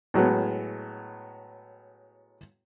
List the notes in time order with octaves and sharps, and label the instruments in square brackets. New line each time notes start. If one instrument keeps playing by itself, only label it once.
[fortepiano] A2 F#3 G#3 B3